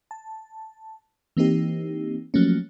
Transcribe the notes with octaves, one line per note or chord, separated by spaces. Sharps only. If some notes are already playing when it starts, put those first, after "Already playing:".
A5
E3 A#3 C4 D#4 G4
F3 F#3 A3 A#3 C#4